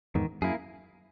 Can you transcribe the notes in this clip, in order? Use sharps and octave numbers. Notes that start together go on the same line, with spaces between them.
E2 G#2 D#3
F#2 A#3 E4 G#4